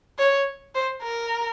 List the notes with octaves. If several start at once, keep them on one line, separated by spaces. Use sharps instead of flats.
C#5
C5
A#4